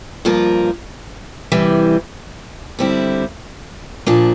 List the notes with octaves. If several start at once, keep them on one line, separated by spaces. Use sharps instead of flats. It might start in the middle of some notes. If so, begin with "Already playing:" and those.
G2 F3 A#3 F4 A#4
C3 E3 G3
D3 G3 C4 E4
A#2 F3 A#3 D4